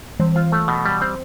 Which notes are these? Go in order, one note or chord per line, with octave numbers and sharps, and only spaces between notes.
E3 C4
F4
A3
B2
G3
C4